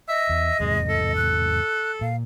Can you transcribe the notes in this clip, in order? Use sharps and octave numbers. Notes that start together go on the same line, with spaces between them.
D#5 E5
E2
E2 G#2 C3 G#3
A4
F#6
A#2 F5